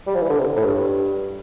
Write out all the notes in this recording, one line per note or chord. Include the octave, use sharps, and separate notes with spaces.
G3
F3
E3
D3
C3
A2
G2